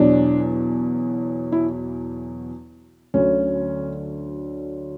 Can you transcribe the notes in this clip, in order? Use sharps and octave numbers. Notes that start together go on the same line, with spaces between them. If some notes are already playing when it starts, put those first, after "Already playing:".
Already playing: E2 B2 F#3 D4
E4
D2 D3 F#3 C#4